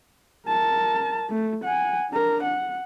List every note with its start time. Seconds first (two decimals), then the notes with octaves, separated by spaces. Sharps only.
0.48 A#4 A5
1.30 A3
1.64 F#5 G#5
2.10 D4 A#4
2.43 F#5